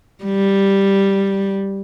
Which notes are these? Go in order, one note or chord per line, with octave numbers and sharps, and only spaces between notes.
G3